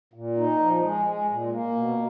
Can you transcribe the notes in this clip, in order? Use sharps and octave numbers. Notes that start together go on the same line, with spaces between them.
A#2
D#4
F3
G#3
G#3
A#2
A#3
B2